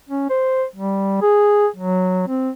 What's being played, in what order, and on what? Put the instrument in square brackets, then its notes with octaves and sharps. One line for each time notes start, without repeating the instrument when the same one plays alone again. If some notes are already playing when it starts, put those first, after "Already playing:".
[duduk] C#4
C5
G3
G#4
F#3
C4